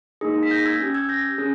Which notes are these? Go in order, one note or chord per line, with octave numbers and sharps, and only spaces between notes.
A#3 D#4 G#4
B6
G6 A#6
E6 G#6
C#4 G4
E6 G#6
G6 A#6
C#4 G#4